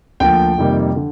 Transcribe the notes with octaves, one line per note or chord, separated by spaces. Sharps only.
D2 D3 F3 A#3 G5
F2 C3 D#3 G3 A#3
D3